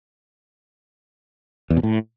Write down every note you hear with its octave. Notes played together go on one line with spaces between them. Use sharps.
E2
B2
A2